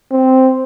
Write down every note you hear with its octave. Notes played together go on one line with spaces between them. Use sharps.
C4